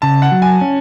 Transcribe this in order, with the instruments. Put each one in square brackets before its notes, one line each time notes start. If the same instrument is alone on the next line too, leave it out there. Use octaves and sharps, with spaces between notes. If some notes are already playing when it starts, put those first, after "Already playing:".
[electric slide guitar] C#3 [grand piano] A5
[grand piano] F#5
[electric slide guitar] F#3
[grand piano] G#5
[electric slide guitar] C#4